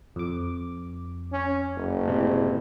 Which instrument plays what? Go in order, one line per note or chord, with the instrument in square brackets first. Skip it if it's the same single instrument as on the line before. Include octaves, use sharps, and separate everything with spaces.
[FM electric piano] F2 D6
[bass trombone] C#4
F#1
[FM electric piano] A2 C3 G#3